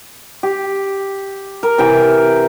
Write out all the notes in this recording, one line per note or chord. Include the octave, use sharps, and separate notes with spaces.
G4
A#4
C3 E3 G5